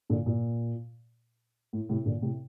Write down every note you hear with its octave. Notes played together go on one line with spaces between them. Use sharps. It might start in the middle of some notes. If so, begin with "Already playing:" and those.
A#2 D3
A#2
A2
A2 C3
A#2 D3
A2 C3